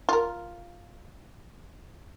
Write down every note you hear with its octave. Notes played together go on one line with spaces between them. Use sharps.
F4 A#4